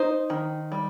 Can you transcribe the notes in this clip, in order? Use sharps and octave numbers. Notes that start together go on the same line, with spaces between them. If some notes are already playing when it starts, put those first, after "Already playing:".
Already playing: D#4 C5
D#3
G3